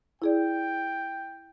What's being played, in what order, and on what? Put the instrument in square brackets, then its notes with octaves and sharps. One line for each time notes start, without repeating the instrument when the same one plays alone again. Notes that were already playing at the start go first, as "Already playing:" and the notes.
[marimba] E4 G#4 D5 [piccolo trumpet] G5